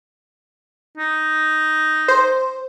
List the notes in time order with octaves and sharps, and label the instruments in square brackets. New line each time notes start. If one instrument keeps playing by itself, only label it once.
[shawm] D#4
[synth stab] C5